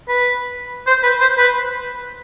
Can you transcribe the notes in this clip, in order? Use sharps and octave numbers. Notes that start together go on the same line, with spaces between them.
B4
C5
B4
C5
B4